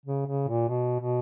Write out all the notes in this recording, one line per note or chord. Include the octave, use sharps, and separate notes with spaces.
C#3
C#3
A#2
B2
B2